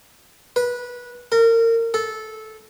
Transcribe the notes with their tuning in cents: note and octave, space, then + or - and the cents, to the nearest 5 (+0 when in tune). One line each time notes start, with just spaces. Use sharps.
B4 -15
A#4 -30
A4 -15